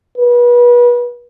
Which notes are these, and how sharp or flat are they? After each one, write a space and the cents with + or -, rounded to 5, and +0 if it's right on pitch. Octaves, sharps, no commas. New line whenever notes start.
B4 -30